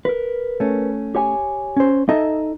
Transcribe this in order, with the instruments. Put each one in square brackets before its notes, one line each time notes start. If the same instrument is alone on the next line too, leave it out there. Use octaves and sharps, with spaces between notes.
[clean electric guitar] A#4 B4
[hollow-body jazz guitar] A3 C#4
[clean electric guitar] G4 C#5 G#5
[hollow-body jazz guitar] C#4 C5
[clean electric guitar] D#4 [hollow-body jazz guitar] A4 D#5 E5